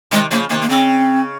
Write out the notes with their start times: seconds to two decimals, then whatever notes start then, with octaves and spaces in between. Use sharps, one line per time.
0.11 C3 D#3 G#3
0.31 C#3 F3 A#3
0.50 C3 D#3 A#3
0.61 A#3
0.69 C#3 C4